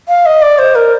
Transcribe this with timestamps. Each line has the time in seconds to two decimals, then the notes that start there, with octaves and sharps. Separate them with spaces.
0.08 F5
0.26 D#5
0.42 D5
0.58 C5
0.75 A#4